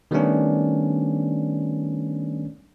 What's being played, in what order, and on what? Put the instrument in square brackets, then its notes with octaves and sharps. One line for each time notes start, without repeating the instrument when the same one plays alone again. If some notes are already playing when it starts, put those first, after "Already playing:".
[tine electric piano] D#3 G3 A3 B3 C#4 D4